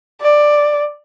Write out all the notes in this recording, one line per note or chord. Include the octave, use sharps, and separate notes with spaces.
D5